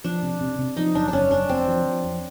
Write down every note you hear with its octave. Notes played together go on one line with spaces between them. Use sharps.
F3 D4
C3
C3
C3
F3 D#4
F#1 D4
F#1 C#4 D4
F#1 D4
F1 C4
F3
F3
F2